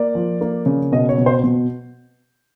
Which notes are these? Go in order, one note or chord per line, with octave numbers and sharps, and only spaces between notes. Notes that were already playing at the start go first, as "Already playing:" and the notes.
Already playing: A#3 D5
F3
A#3
C#3
B2 D#5
C#5
B2
C5
B2